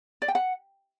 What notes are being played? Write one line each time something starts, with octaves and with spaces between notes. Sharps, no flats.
D5
G5
F#5